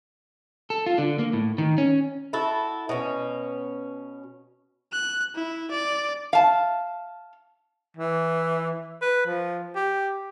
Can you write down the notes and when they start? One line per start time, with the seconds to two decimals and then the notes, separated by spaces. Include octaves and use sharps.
0.70 A4
0.86 F4
0.98 D3
1.19 A#3
1.33 A2
1.58 D#3
1.78 C#4
2.33 E4 F#4 A4
2.89 B2 C#4
4.92 F#6
5.35 E4
5.71 D5
6.33 F5 A5
7.97 E3
9.02 B4
9.26 F3
9.76 G4